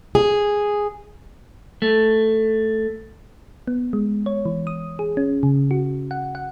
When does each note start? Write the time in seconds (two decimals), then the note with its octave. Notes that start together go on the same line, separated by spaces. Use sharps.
0.15 G#4
1.82 A3
3.68 B3
3.93 G#3
4.26 C#5
4.45 E3
4.67 D#6
4.99 G#4
5.17 C#4
5.43 C#3
5.71 F#4
6.11 F#5
6.35 F#5